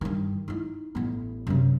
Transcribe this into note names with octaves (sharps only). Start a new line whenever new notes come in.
G2 D#3
D#4 E4
A1 B3
F#2 C3